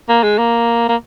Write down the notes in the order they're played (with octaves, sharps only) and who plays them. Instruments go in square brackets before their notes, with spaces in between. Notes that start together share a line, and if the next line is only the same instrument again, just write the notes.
[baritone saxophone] A#3
G#3
A#3
A#3